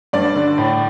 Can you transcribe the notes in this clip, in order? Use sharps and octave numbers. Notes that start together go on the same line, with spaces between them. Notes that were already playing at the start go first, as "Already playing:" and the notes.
G2 D5
D3
A2